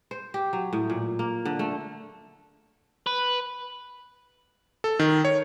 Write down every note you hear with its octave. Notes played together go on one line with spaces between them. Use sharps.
C5
G4
F#3
A2
A#2
A#3
D3
A3
B4
A4
D#3
C#5